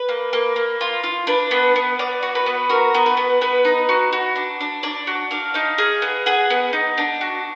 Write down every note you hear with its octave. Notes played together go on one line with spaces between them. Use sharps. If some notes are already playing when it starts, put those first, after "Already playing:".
Already playing: B4
A#3
A#3
A#3
F4
F4
D4 B4
B3
B3
B3 D5
F#4
B4
B3
F#4 A#4
B3
B4
B3
B3 B4
D#4
F#4
F#4
D4
D4
D4 D5
F#4
D4 F5
D#4 F5
G#4
B3
G#4 F#5
B3
D#4
D4
F#4